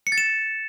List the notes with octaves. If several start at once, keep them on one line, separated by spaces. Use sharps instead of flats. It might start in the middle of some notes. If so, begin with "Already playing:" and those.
C#7
A6
E7